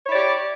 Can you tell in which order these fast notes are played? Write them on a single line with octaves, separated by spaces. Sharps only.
C#5 E4 D5 G4